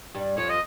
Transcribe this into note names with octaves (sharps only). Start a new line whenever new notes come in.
G2 G3
F2 F3 C#5
D#5